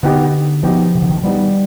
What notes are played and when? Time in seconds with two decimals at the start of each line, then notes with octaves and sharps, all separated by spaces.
0.03 B2 D3 B3 D#4 G4
0.63 B2 F3 B3 D#4 G4
0.95 C3
1.02 D3
1.10 D#3
1.17 F3
1.24 B2 G3 B3 D#4 G4